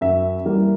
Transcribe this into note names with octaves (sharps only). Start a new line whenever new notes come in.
F#2 E5
E3 G3 A#3